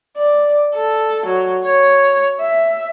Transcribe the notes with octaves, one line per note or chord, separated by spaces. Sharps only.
D5
A4
F#3
C#5
E5